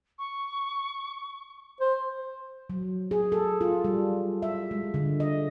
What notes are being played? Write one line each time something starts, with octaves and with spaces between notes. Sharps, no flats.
C#6
C5
F#3
G#4
A4
F4
G3
E5
G#3
D3
D#5